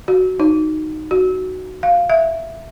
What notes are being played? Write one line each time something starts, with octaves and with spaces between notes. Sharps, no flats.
F#4
D#4
F#4
F5
E5